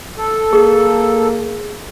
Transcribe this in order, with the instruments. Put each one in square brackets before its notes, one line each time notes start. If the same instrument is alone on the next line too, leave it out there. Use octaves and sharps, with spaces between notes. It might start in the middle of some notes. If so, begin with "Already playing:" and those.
[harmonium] A4
[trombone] A#3 [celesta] G#4